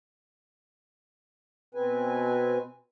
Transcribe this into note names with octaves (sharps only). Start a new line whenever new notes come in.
B2 C4 B4 G#5